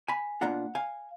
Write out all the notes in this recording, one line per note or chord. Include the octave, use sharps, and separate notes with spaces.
G#5 B5
B2 A#3 D4 F4 F#5 A#5
F5 G#5